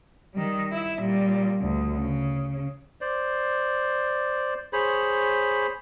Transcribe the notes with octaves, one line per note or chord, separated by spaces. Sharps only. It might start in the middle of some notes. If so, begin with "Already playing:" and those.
D#3 G3
E4 E5
A#2 G3
D2
C#3
C5 D5
G#4 C5 C#5 B5